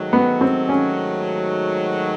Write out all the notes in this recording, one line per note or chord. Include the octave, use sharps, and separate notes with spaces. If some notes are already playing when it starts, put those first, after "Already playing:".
Already playing: G#2 D#3 F#3 A3
B3
C4
C#4